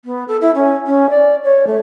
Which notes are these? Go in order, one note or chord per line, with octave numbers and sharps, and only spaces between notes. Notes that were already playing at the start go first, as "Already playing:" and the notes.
B3
A4
E4
C#4
C#4
D5
C#5
A3